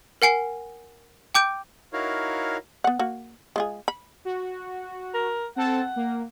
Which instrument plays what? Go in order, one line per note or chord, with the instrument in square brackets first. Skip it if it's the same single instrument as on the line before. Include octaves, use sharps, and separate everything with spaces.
[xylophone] A#4 F#5 G#5 C7
G5 D6 G6 D7
[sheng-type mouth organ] D#4 E4 F#4 A#4 C#5 F5
[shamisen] B3 F#5
A#3 F#4
G#3 F4 G#4
B5
[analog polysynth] F#4
[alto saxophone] A#4
[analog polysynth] C4 A4 [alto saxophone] F#5
[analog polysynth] A#3